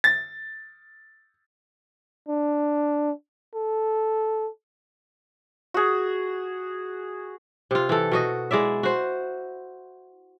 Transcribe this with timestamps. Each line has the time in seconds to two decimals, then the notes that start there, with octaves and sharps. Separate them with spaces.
0.04 A6
2.29 D4
3.55 A4
5.74 F#4 G#4
7.71 C3 F4
7.89 E3 A4
8.12 B2 F#4 D#5
8.51 G#3 E4 D5 E5
8.83 F#4 C5